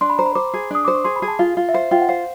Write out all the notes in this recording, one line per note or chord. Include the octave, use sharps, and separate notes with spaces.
D4 C6
B5
C5 A#5
B5
C5 D6
G#4
D4 D#6
C5 D6
C#6
G#4 C6
B5
G#4
A5
F4 F5
F4
E5
C5 F5
F4 G5
F#5
C5 F5